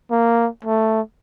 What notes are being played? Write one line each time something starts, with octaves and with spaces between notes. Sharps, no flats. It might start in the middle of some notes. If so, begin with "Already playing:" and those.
A#3
A3